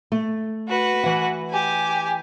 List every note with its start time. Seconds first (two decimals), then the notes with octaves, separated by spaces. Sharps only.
0.12 A3
0.68 F#4 B4
1.04 E3 F#5
1.49 G4 G#5